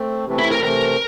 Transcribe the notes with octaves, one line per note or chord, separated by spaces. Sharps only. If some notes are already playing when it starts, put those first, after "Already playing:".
Already playing: A3 C4
C3 E3 A3 C4
E4
A#4
C3 E3 A3 C4 A#4